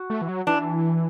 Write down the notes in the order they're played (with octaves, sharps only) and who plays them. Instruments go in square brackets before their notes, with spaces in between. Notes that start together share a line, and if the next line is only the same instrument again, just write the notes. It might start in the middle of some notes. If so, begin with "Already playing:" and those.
Already playing: [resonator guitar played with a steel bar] F#4
[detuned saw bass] A3
E3
F#3
[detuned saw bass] E3 [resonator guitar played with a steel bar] D4